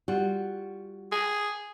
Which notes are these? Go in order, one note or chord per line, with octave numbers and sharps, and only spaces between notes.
G3 F4 F#4
G#4